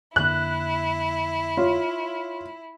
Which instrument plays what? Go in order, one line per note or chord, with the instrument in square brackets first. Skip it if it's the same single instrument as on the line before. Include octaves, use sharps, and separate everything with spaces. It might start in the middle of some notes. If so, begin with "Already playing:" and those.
[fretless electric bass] F2 D3 A#3 [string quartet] E4 [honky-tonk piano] F#6
[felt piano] F4 C#5